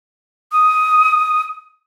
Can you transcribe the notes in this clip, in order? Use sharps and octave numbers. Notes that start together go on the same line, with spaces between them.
D#6